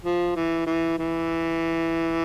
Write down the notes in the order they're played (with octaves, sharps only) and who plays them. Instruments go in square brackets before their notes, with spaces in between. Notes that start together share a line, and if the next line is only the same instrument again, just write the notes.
[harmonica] F3
E3
E3
E3